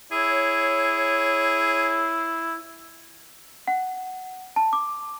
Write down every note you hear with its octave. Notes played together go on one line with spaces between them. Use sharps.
E4 G#4 C#5
F#5
A5
D6